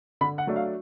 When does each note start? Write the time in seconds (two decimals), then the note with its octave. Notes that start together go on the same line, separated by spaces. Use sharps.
0.21 D3 B5
0.38 F#5
0.47 F#3 A3 D4
0.56 F5